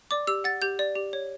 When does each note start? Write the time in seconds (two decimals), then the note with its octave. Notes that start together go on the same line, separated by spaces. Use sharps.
0.11 D5 D6
0.27 G4 E6
0.44 F#5 A6
0.62 G4 G6
0.79 D5
0.96 G4
1.13 C#5